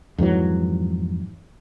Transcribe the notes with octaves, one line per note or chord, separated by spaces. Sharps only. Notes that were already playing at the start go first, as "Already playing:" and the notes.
F2 G#2 E3 F#3